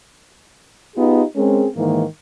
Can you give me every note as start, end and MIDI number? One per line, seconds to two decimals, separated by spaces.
0.95 1.22 59
0.95 1.22 63
0.95 1.22 65
0.95 1.22 67
0.95 1.22 68
1.36 1.66 56
1.36 1.66 60
1.36 1.66 61
1.36 1.66 68
1.36 1.66 70
1.76 2.03 44
1.76 2.03 51
1.76 2.03 52
1.76 2.03 58